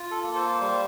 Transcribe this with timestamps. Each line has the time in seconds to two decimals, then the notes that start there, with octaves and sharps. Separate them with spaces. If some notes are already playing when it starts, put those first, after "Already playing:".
Already playing: F4
0.11 A4
0.23 A#3
0.35 C5
0.61 G3 C5